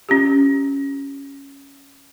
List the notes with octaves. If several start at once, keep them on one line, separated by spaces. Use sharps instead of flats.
C#4 F4 G4